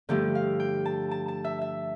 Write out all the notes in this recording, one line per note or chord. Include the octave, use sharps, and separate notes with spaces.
G2 D3 F3 A3 G4
F5
G5
A5
A5
A5
E5
E5